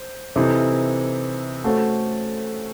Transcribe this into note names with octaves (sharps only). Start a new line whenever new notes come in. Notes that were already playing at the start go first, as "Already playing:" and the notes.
Already playing: C5
C3 E3 C4 D#4 A4
A3 C#4 F#4 A4 C5